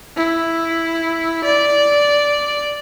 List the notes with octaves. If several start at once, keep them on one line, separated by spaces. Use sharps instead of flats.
E4
D5